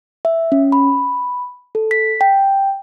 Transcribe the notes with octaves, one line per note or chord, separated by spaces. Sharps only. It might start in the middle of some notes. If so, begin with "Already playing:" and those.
E5
C#4
B5
A4
B6
G5